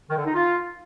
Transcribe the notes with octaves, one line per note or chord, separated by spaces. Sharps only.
D#3
D3
D#4
F4